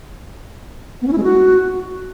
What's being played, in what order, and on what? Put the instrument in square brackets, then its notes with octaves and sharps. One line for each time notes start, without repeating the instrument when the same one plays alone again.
[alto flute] B3
C#4
E4
G#3
F#4